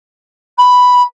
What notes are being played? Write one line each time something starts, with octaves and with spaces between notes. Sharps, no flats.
B5